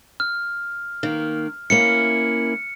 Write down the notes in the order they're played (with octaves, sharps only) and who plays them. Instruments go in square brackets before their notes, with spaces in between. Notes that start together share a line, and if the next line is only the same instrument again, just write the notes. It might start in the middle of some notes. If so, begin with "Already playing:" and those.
[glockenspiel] F6
[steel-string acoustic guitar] D#3 A#3
[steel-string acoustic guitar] A#3 C#4 E4 [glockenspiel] C#7